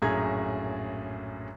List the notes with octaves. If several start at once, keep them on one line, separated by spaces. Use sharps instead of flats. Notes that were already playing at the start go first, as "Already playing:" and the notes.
A#1 F#2 A2 G#4 A#5 G#6